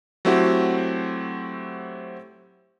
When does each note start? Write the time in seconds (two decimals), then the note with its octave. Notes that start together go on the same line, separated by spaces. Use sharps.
0.25 F#3 A3 C4 E4 F#4 G4